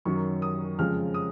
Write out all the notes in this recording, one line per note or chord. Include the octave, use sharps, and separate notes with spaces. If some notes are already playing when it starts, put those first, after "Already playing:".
F#2 D#3 F#3 C#6
D#6
F2 C#3 F3 G#3 F6
D#6